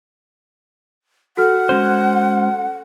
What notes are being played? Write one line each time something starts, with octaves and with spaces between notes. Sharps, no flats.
F#4 A4 F#5 F6
G#3 C#4 C5